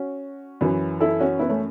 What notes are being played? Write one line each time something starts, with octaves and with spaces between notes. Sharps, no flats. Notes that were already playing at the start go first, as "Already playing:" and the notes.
Already playing: C#4 F#4
F#2 E3
E4 A4
C#4 F#4
B3 E4
A3 C#4